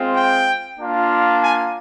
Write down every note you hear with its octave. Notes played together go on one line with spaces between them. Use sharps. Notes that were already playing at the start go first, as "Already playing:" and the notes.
Already playing: G#3 C4 F4
G5
A#3 D4 F4
G#5